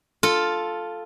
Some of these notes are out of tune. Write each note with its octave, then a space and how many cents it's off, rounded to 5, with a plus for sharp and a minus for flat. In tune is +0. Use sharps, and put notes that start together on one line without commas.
F4 +0 A4 +0